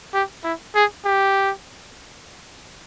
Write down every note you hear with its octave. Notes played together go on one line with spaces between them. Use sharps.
G4
E4
G#4
G4